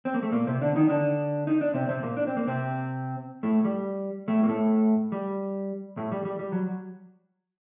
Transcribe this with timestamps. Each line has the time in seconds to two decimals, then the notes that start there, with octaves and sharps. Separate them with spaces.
0.05 C4
0.14 A#3
0.23 A3
0.32 A#2 A#3
0.47 C3 C4
0.61 D3 D4
0.76 D#3 D#4
0.89 D3 D4
1.47 D#4
1.61 D4
1.74 C3 C4
1.89 C3 C4
2.02 A#2 A#3
2.17 D4
2.27 C4
2.37 A#3
2.47 C3 C4
3.43 A2 A3
3.64 G3
4.28 A2 A3
4.43 A#3
4.49 A2 A3
5.12 G3
5.97 A2 A3
6.12 G3
6.25 G3
6.39 G3
6.52 F#3